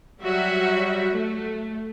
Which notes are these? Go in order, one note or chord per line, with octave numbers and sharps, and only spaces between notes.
F#3 G3 F#4 E5
A3